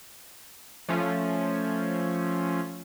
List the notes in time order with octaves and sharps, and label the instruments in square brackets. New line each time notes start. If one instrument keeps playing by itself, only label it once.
[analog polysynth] F3 A3 C#4